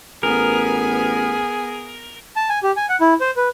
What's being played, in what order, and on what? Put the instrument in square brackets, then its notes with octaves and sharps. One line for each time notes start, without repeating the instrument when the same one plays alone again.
[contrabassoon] A1 [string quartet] B3 G#5 [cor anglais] G#4 [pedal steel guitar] A#4
[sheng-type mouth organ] A5
G#5
G4
G#5
F#5
E4
C5
B4